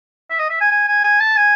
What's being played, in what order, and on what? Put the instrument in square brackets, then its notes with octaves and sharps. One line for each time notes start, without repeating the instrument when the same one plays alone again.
[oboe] E5
D#5
E5
G#5
G#5
G#5
G#5
A5
G#5